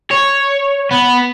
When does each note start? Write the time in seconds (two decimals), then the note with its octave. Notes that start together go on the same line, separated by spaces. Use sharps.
0.11 C#5
0.91 B3